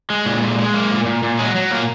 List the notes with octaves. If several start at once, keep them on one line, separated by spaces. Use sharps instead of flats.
G#3
A#2
G#3
G#3
A#3
A#2
A#2
A#2
F#3 G#3 G#4
F#3
A#2 A#3 A#4